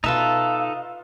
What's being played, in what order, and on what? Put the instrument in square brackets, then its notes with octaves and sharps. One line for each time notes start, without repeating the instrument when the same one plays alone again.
[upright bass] B2 [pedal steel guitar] D#4 A4 [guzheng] F4 B4 E5